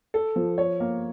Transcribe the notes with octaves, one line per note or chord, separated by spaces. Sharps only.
A4
F3
C#5
A#3